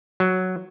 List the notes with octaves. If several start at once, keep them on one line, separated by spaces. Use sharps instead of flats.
F#3